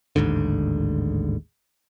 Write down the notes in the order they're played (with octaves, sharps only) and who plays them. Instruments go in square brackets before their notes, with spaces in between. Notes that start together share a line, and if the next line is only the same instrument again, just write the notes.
[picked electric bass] A1 D#2 G#2 D3